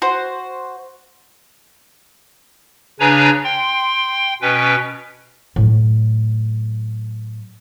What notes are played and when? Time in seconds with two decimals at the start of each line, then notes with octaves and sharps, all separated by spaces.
0.02 F#4 C5
3.00 C#3 D4 B4 C#5 G#5 A#5
3.44 G5 C6
4.42 B2 C#4 B4 G5
5.56 A2 F#3